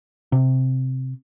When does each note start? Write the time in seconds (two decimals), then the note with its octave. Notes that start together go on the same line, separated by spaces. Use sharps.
0.32 C3